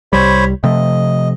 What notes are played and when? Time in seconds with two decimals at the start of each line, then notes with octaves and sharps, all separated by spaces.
0.13 C2 G3 C5 C#5 B5
0.64 C3 F3 A3 D#5